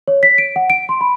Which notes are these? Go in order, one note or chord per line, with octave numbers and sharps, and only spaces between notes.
C#5
B6
D7
F#5
D7
C6
B5